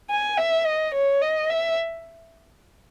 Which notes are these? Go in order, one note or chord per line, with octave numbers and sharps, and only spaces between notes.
G#5
E5
D#5
C#5
D#5
E5